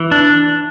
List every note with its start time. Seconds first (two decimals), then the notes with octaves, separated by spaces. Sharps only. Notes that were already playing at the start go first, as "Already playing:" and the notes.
Already playing: E3
0.11 D4